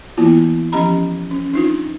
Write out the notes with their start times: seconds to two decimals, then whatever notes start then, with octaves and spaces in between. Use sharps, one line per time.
0.17 E3 A#3 B3 E4 F4
0.72 F3 C#4 G4 D#5 A#5 B5
1.31 C#4
1.53 D4 D#4 F4